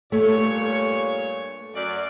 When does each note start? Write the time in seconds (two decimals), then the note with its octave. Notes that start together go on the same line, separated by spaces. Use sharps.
0.12 G2 A#2 A3 C#5
1.75 F#2 D5